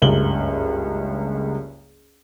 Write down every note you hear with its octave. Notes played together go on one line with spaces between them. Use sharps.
F#1 C#2 G2 F#7 G7